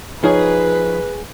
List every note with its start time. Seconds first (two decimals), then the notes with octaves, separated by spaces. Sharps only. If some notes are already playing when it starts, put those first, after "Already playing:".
0.24 F3 D#4 G#4 B4 C#5 G#5